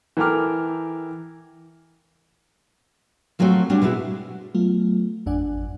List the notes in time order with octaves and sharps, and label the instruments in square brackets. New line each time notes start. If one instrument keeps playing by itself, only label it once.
[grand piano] E3 A4 A#4 G5 D6 F6
[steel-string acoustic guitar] F3 F#3 A3 A#3 C4 F#4
G3 C4 D4 F#4 C#5
B2 G#3 E4 F#4
[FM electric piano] F#3 A3 B3 F4
G#1 F2 D4 D5 F#5 G#5